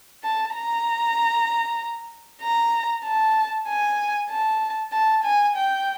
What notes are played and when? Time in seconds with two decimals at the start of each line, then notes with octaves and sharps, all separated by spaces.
0.24 A5
0.55 A#5
2.42 A#5
3.04 A5
3.68 G#5
4.30 A5
4.92 A5
5.24 G#5
5.56 G5